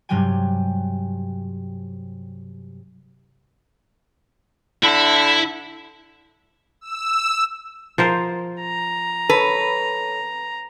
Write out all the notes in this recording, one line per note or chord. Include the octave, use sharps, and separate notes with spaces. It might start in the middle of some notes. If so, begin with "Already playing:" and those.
G2 C3 F#3 G3 G5 G#5
D3 E4 E5
E6
F3 A#4 C5
A#5
A4 B4 C#5